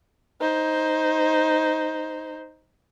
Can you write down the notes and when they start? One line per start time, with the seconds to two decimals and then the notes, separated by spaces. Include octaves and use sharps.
0.41 D#4 C5